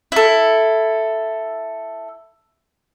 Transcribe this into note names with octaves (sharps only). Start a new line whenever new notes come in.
E4 A4